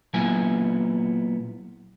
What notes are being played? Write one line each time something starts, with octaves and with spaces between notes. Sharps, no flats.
A#2 F#3 B3 E4 G#5